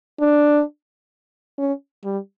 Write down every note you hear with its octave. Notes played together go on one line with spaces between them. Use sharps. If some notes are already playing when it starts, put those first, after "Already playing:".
D4
C#4
G3